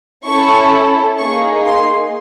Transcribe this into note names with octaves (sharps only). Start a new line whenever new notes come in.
C#4 E4 A4 C#6
A#3 D#4 G#4 C#6
C6